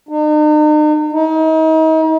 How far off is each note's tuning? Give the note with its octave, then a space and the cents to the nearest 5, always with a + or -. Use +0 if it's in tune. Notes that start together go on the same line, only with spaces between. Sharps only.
D#4 -45
D#4 +35